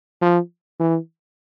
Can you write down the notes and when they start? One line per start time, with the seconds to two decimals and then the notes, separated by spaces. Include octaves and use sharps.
0.22 F3
0.80 E3